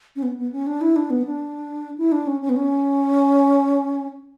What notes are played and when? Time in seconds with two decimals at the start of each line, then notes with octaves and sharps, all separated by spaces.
0.16 C#4
0.23 B3
0.37 B3
0.52 C#4
0.67 D4
0.81 E4
0.96 D4
1.10 B3
1.25 D4
1.98 E4
2.12 D4
2.27 C#4
2.42 C#4
2.49 B3
2.56 C#4